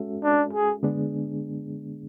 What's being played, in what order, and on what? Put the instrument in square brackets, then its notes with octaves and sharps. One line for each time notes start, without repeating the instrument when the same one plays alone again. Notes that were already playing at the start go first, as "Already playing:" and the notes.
Already playing: [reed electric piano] G#3 C#4 F#4 A4 E5
[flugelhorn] D4
G#4
[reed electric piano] D3 G#3 B3 D4 G#4